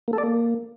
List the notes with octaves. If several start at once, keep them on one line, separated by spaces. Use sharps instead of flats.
A#3
A4
D5
A#3